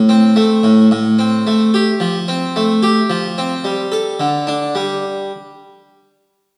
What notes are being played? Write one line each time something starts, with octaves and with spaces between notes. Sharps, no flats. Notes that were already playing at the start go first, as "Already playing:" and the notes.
Already playing: A2
C4
A3
A2
A2
C4
A3
G4
F3
C4
A3
G4
F3
C4
G3
A4
D3
D4
G3